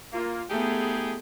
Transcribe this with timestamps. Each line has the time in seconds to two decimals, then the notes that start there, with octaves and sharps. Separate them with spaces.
0.13 A#3 F4
0.50 A3 B3 D#4 G4 G#4